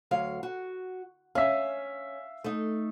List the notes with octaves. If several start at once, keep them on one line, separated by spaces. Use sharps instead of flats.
D2 F#3 F5
F#4
C#4 E5 F5
A3 D#4